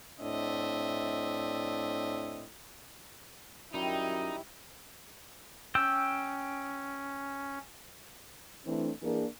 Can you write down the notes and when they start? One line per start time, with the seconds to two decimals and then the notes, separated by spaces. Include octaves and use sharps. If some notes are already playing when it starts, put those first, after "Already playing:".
0.20 A2 C4 D4 D#5 E5
3.74 F#2 D#3 G3 D#4 E4
5.75 C#4 G5 E6 G6
8.66 E3 A3 C4 D4
9.02 E3 A#3 D4 G#4 A#4